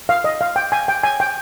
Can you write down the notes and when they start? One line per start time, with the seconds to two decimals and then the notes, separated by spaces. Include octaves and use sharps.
0.09 F5
0.24 D#5
0.41 F5
0.56 G5
0.72 G#5
0.88 G5
1.03 G#5
1.20 G5